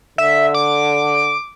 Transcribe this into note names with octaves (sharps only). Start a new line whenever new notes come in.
D3 E5
D6